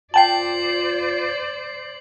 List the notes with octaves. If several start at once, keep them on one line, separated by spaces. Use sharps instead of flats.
F4 C5 D5 G5 A5 C7 F#7